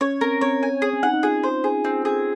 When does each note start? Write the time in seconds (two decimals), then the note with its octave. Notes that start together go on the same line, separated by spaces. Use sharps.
0.01 C#4 C#5
0.21 C4 A#4
0.41 C4 C#5
0.63 G#5
0.82 C4 G#4
0.93 C#4
1.03 D#4 F#5
1.14 D#4
1.23 F4 G#4
1.44 C5
1.64 G#4
1.85 C4
2.05 G#4